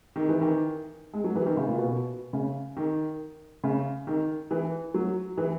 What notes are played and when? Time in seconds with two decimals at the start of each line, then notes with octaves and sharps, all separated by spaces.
0.16 D#3
0.29 E3
0.41 D#3
1.13 G#3
1.24 F#3
1.35 E3
1.46 D#3
1.57 C#3
1.68 A#2
1.78 B2
2.33 C#3
2.77 D#3
3.64 C#3
4.07 D#3
4.51 E3
4.94 F#3
5.38 E3